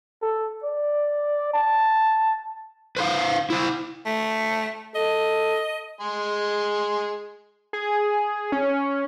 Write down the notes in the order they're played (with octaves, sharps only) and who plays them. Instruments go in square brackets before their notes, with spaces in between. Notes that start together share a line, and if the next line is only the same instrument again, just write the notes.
[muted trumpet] A4
D5
A5
[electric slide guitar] B4 C5 F5
E4 C5
[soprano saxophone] A3
[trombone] A4 [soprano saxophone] D#5
[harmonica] G#3 G#4 C6
[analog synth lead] G#4
C#4